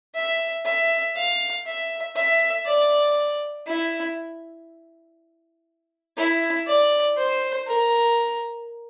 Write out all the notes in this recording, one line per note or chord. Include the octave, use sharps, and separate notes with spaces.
E5
E5
F5
E5
E5
D5
E4
E4
D5
C5
A#4